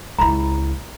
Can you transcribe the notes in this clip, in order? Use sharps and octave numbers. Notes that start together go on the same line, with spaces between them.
C#2 E4 A#5 B5